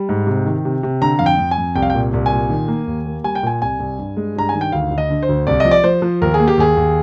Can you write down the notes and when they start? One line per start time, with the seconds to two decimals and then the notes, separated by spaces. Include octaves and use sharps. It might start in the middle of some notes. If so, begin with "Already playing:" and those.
Already playing: G3
0.09 G#2
0.27 C3
0.46 D#3
0.65 C3
0.83 C3
1.02 D3 A#5
1.19 F2 F5
1.26 G5
1.38 F2
1.51 G#5
1.58 F2
1.76 C2 G5
1.82 F5
1.90 G5
1.94 A#2
2.13 C2
2.26 G#5
2.32 A#2
2.50 D#3
2.68 A#3
2.87 D#2
3.06 A#3
3.24 G3 G#5
3.35 G5
3.43 A#2 G#5
3.62 C2 G#5
3.80 C2
3.98 G2
4.17 G#3
4.36 G2 A#5
4.49 G#5
4.54 D#3
4.61 G5
4.72 D2 F5
4.91 D2
4.98 D#5
5.10 D3
5.23 C5
5.29 D2
5.47 C2 D5
5.60 F3 D#5
5.71 D5
5.84 F3 C5
6.02 F3
6.21 D#2 A#4
6.34 G#4
6.39 A#3
6.48 G4
6.58 D#2 G#4
6.77 D#2